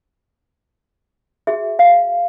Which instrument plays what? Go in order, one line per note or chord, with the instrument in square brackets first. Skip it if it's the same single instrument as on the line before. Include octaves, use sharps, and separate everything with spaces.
[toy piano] F#4 G#4 E5
F5